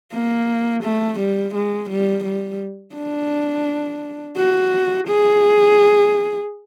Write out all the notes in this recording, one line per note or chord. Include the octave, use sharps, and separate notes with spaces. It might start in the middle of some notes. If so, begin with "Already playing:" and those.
A#3
A3
G3
G#3
G3
G3
D4
F#4
G#4